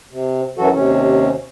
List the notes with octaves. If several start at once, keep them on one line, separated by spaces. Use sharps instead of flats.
C3
F#2 E3 F#3 F#4 A4
D#2 C3 C#4